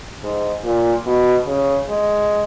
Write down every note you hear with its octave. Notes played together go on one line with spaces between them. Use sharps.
G#2
A#2
B2
C#3
G#3